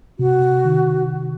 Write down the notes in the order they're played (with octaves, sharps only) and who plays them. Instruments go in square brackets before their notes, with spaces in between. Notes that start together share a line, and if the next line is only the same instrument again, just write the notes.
[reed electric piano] C3 [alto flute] F#4
[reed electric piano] D#3